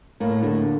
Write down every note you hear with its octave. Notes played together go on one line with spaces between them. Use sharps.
A2 A#3
A2 D3